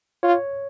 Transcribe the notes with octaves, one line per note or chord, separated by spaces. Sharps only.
F4 C#5